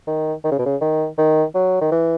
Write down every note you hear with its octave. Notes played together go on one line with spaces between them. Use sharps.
D#3
D#3
C#3
B2
C#3
D#3
D#3
F#3
D#3
E3